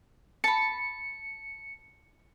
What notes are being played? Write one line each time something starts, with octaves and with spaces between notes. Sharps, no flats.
A5 B5 C#7